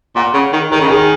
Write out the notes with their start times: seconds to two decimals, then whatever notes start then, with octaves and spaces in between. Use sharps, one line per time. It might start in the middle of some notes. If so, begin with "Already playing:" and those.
0.16 A#2 F#5
0.34 C#3
0.53 D#3
0.72 D#3 A#4
0.81 C#3
0.89 D#3 G#4